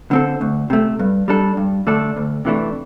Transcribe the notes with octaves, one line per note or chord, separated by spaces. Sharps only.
D3 C4 A4
D2
C3 A3
G2
G3 D4 A4
G2
D3 A3 D4 A4
D2
C3 E3 A3 D4